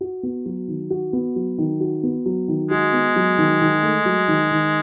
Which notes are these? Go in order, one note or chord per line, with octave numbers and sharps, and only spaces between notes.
F#4
B3
F#3
D#3
F#4
B3
F#3
D#3
F#4
B3
F#3
D#3
G#3 F#4
B3
F#3
D#3
D#3
A3
F#3
D#3
D#3